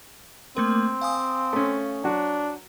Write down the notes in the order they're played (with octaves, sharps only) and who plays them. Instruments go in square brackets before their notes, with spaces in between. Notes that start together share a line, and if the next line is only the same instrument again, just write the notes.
[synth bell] A3 A#3 A#4 [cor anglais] C4
[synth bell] F5 G#5 D#6
[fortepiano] A3 C#4
[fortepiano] F#3 F#4 [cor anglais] D4